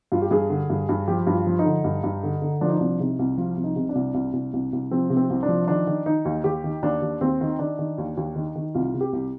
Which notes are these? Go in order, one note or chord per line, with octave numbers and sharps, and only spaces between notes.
G2 F4
G4
G2 G#4
D3
G2
G2
F3 G4
G2
F4
F3
D#4
D3
G2
G2
D3
D3
F3 D4
D#4
C2 D4
C3 D#4
C2
F3 F4
C2
D#4
C3
D4
C2
C2
C2
C2
C2
F3 C4
C3
C4
C2
D4
F3
D#3 D4
D#3
D#3 D#4
D#2
D#2 G4
D#3
D#2 D4
D#2
D#2 C4
D#3
D#3 D4
D#3
D#2
D#2
D#3
D#3
C2 F4
C3
G4
C2